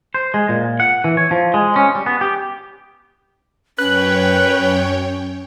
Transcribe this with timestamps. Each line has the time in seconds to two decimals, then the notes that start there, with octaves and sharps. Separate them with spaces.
0.14 C5
0.34 G#3
0.49 A#2
0.80 F#5
1.04 E3
1.17 C#5
1.31 F3
1.54 G#3
1.76 C#4
1.95 G3
2.06 B3
2.21 G4
3.79 F#2 C#4 B4 C#5 G5 F#6